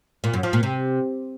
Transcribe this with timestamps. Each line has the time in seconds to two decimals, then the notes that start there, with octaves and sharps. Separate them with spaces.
0.24 A#2
0.33 F#2
0.43 F3
0.53 A#2
0.63 C3